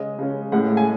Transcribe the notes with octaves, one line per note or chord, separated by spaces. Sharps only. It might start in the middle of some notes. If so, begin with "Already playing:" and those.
Already playing: C#3 G#3 C#4 D#5
C#3 G#3 C#4
A2 G#3 C#4 F#5
G#5